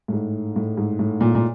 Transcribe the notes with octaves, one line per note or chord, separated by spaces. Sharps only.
A2
G#2
A2
G#2
A2
A#2
A#2